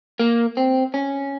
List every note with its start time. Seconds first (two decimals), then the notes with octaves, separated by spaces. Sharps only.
0.19 A#3
0.57 C4
0.94 C#4